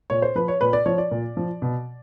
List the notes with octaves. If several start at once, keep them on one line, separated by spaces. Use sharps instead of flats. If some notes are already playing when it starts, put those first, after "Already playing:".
A#2 C#5
C5
F3 B4
C#5
A#2 B4
D5
F3 C#5
D5
A#2
F3
B2